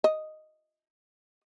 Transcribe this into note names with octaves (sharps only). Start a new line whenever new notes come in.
D#5